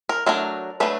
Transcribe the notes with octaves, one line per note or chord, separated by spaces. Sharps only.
A#4
F#3 A3 D4 A#4
F#3 A3 D4 B4